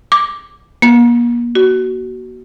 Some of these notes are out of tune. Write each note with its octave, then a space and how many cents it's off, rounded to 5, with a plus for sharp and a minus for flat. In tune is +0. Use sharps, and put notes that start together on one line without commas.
D6 +0
A#3 +40
F#4 +20